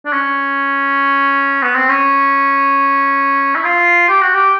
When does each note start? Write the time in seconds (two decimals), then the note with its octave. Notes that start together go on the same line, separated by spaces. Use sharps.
0.05 D4
0.13 C#4
1.63 B3
1.75 C4
1.89 C#4
3.55 E4
3.65 F4
4.09 G4
4.22 F#4
4.34 G4